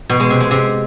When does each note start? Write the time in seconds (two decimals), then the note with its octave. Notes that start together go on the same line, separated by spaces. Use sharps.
0.10 B2
0.20 G#3
0.30 C3
0.41 G#3
0.51 C3